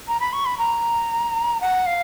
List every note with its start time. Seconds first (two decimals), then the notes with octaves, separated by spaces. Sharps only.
0.08 A#5
0.20 B5
0.33 C#6
0.46 B5
0.58 A#5
1.61 F#5
1.86 F5